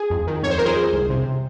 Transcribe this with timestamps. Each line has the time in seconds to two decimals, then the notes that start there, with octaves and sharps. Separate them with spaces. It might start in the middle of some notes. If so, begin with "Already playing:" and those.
Already playing: G#4
0.10 F2
0.27 D#3
0.43 F2 C#5
0.50 C5
0.58 F2 A#4
0.65 G#4 C5
0.76 F2
0.93 C2
1.10 C3